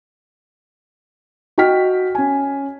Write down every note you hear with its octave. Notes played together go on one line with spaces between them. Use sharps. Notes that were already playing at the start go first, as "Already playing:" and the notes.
F#4 D#5 G5 F6 B6
C#4 G#5